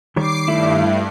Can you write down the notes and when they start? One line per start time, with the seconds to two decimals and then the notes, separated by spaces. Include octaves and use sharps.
0.16 D#3 G3 C#5 D6 C7
0.48 G2 A3 E4